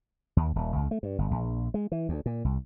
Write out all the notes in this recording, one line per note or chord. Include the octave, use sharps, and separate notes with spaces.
D#2
D#1
C#2
A3
G2
G1
A#1
G#3
E3
D2
A#2
C2